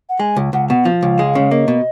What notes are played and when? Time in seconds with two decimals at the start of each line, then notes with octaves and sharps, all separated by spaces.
0.09 F#5
0.20 G#3 G#5
0.37 C#2
0.53 C#2 F#5
0.69 B2 F#5
0.85 F3 F5
1.03 C#2
1.19 G#3
1.35 C#3
1.51 A#3 D#5
1.68 B2